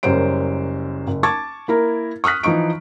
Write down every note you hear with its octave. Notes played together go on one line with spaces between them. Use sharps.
F#1 F#2 G3 C5 C#5 D7
F#1
A5 C#6 D6 G#6 A6
A#3 E4 A#4
C#6 D#6 F6 F#6 B6
E3 F3 D#4 C#6 D7